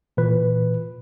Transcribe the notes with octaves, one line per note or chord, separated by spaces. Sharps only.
A#2 E3 B4